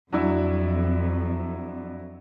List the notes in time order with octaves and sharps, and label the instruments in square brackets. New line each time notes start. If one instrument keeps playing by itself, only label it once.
[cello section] F2 [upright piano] F#3 D4 E4